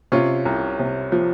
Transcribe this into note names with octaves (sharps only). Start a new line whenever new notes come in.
C3 C#4 F4
C2
C3
F3